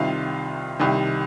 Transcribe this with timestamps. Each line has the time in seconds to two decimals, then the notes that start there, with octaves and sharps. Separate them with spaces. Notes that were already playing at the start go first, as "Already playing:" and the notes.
Already playing: C2 C3 D#3 F4 F5
0.80 C2 C3 D#3